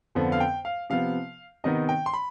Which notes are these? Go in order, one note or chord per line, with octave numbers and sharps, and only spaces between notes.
F2 D3 F3 B3
F5
G5
F5
C3 F3 B3 F5
C3 D#3 B3 D#4 D#5
G5
C6
B5